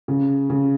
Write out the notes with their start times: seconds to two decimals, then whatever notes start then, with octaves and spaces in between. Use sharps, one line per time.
0.08 C#3
0.50 C#3